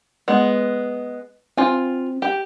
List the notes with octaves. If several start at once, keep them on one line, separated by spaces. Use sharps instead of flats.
G#3 B3
C4 F4 G#5
G4